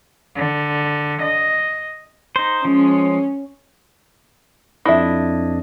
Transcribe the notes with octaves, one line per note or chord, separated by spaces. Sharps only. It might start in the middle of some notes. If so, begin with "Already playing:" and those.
D3
D#5
D#4 C5
F3 G#3 C#4
F2 D4 E4 D#5 E5